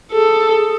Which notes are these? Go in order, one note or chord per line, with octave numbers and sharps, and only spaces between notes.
G#4 A4
G#4